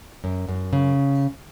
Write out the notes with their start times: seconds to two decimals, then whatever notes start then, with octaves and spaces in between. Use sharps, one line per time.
0.24 F#2
0.49 F#2
0.73 C#3